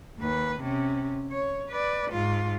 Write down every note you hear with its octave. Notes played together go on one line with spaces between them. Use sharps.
D#2 B4
C3 C#4
C#5
B4 D5
G#2 F4